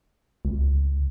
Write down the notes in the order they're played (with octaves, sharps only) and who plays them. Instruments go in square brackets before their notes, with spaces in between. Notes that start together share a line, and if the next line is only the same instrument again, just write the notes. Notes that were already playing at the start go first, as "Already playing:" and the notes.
[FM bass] C#2